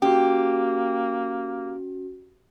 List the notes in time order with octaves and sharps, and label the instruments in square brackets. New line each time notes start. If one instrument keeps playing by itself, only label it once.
[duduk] A#3 [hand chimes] C#4 F#4 [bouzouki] G4